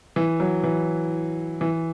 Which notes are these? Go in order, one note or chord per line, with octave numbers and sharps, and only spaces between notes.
E3
F#3
E3
E3